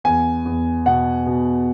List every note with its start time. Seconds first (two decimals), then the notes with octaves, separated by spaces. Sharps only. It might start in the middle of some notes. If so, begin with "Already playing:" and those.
0.04 E2 G#5
0.45 E2
0.86 B2 F#5
1.26 B2